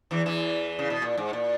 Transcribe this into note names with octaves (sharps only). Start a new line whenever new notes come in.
E2 E3
E2 E3
C#3
B2
A#2
G#2
A#2